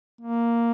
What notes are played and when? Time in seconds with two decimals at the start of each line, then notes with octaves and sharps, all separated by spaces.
0.21 A#3